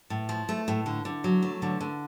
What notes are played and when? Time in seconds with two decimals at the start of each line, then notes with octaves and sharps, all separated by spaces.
0.10 A2
0.29 F3
0.49 A3
0.68 A2
0.86 D3
1.05 D3
1.24 F#3
1.42 A3
1.62 D3
1.80 D3